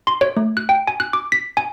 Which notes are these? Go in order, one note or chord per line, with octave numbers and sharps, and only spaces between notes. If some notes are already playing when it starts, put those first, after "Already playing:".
C6
C#5
A3
F#6
G5
G#5
F#6
D6
B6
G#5